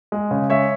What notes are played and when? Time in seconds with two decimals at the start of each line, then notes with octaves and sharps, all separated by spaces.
0.12 G#3
0.31 C#3
0.50 G#3 C#5 E5